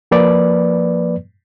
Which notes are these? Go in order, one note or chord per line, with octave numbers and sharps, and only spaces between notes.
F3 A#3 B4 D5